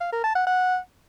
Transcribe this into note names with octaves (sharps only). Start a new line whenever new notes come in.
F5
A#4
A5
F#5
F#5